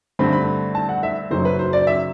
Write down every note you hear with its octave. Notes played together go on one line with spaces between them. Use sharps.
G2 D3 A3 C4 B5
B5
A5
F#5
E5
F#1 F#2 F#3 C5
B4
C5
D5
E5